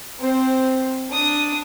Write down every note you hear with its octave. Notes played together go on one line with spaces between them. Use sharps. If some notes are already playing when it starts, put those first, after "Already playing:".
C4 C5
D4 D#6